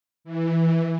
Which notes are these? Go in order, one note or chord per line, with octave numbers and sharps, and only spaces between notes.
E3